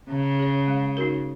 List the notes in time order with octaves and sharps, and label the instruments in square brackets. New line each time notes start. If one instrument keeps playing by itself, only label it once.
[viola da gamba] C#3 [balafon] C#4
[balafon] G#4 C#5
G#3
D#4 F#4 A#4